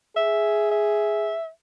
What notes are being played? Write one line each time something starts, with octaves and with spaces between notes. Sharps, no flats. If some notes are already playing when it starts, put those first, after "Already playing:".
G#4 E5
E5